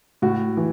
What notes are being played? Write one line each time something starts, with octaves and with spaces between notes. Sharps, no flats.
A2 F#4
E3